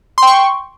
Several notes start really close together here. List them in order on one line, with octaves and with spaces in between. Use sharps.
C6 G5 C#6